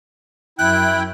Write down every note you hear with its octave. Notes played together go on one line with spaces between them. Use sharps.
F#2 E4 G5 F#6